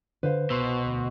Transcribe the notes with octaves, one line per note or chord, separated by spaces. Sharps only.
D3 B4 C5 F5
C2 B2 C6 E6
D2